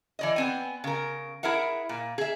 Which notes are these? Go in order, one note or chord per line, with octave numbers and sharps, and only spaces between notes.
E3 D5 D#5
B3 C4 G#5
C#3 A#4
E4 G#4 A#4 E5 F#5
A#2
G#4 E5